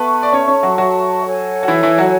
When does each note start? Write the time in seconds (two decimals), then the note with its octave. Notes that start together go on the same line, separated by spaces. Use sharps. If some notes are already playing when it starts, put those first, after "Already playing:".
Already playing: B3 A4 B4 E5 A5 C#6
0.23 D5
0.33 C#4 C#5
0.47 C#4 C#5
0.63 F#3 F#4
0.78 F#3 F#4
1.23 A4 C#5 G#5
1.63 F#4
1.68 E3 E4
1.83 E3 E4
1.98 F#3 F#4